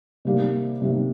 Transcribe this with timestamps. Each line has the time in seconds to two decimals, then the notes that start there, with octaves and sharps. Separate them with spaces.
0.25 C3 G3 A#3 D#4
0.82 C3 G3 A#3 D#4